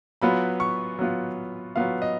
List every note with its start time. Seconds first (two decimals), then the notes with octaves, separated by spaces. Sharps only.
0.22 F#3 B3 F4 B5
0.60 C#6
0.99 F#3 B3 F4
1.76 F#3 B3 F4 F5
2.02 D#5